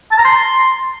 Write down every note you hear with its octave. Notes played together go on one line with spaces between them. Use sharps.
A5
A#5
C6